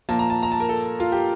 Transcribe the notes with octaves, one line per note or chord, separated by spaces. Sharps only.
A#2 F3 A#3 A5
A#5
A5
A#5
A5
A#4
A4
F4
G4